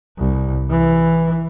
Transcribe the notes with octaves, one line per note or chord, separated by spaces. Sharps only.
C2
E3